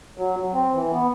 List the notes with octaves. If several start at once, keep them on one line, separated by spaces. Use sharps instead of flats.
F#3
F#3
C4
E3
B3